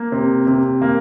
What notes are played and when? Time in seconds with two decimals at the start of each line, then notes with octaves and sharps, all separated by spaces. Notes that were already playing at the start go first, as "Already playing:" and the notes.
Already playing: A#3
0.12 C3
0.47 C3
0.81 A#3